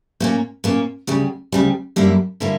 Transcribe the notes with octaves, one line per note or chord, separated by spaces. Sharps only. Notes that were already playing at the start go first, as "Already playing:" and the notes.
A#2 A#3 C#4
A#2 A#3 C#4
D2 C#3 G3
D2 C#3 G3
F#2 D3 G3 A#3 E4
D3 G3 A#3 E4